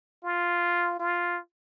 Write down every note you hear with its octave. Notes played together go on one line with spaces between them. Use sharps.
F4
F4